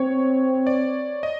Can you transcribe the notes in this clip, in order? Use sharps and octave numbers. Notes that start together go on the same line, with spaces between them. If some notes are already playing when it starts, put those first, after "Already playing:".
Already playing: C4 C#5
D5
D#5